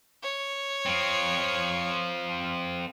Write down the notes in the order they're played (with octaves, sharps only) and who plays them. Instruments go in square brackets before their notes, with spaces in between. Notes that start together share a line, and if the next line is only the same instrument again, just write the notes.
[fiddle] C#5
[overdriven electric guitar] F3 C4